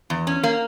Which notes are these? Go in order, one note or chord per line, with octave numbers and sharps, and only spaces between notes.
E2
C#4
A#3